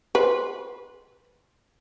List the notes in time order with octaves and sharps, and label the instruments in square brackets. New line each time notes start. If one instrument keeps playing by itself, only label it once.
[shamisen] B4 C5